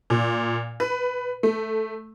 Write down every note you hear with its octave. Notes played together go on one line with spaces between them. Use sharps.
A#2
B4
A3